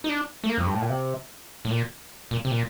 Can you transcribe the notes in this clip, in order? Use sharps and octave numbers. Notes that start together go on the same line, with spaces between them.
D#4
D4
A3
A#3
F2
G2
A2
A#2
C3
A2
A#2
A#2
C3
A#2